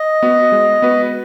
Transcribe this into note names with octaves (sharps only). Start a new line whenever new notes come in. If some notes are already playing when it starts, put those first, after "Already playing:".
Already playing: D#5
B3 F#4 B4
G#3
B3 F#4 B4